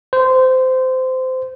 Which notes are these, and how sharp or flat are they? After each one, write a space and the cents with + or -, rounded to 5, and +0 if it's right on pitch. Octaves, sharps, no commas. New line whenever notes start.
C5 -20